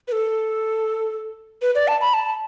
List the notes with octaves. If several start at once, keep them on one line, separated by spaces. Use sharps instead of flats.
B4
A4
B4
D5
A5
B5
A5